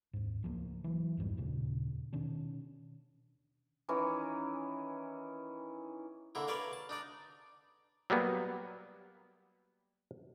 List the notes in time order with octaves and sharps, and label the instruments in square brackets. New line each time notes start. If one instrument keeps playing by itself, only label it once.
[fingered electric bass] D#2 G#2
C#2 F3 G3 A#3
E3 F#3
C2 F2 G#2 G3
E1 D#2 A#2 C#3
B2 D#3 C#4 D4
[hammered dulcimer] D#3 E3 C#4
[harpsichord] D3 A#3 E4
A#4 B4 C#5 D5 F5
A5
D4 D#4 D5
[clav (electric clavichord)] F#3 G3 A#3 B3